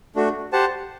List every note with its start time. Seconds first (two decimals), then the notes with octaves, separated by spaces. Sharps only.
0.16 A3 D4 F#4
0.53 G4 C5 F#5 A5